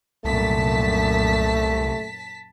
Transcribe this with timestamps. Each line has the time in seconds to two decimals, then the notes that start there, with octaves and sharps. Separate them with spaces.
0.25 C2 F#2 A#2 A3 A5 B6